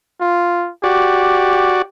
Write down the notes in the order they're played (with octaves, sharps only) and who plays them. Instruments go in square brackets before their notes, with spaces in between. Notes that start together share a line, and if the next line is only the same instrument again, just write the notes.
[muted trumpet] F4
[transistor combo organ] F#4 D5 [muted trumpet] G4